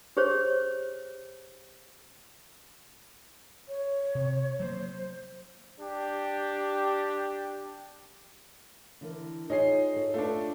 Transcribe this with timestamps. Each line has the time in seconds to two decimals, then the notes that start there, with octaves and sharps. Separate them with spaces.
0.17 G4 G#4 C5 C#5
3.67 C#5
4.15 C3
4.60 F#3 A3 A#3 C5
5.80 D4 G4
9.01 D3 E3 A#4
9.50 D#4 F4 G#4 C5 C#5 C7
9.94 F#4 A4 C#5
10.14 A3 D4 F4 B4